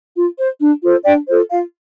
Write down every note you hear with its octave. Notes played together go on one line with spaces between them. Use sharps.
F4
C5
D4
F4 A4 C5
D4 D5 G5
F4 A4 C5
F4 F5